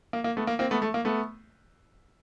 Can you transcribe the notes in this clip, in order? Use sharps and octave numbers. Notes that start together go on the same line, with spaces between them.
A#3
A#3
A3 B3
A#3
A#3 C4
A3 B3
A3
A#3
A3 B3